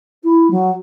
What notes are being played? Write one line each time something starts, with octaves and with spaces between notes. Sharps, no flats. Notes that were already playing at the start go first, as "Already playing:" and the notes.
E4
F#3